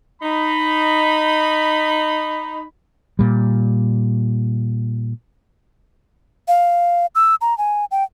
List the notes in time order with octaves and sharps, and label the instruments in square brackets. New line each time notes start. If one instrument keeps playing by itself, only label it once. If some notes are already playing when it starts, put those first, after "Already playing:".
[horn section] D#4 B5
[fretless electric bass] A#2 G3
[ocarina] F5
E6
A#5
G#5
G5